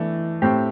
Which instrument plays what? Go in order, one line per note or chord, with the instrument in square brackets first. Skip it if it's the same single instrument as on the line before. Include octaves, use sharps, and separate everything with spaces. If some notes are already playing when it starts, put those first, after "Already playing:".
Already playing: [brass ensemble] E3 [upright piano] A3 D4
[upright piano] A2 A3 C4 G4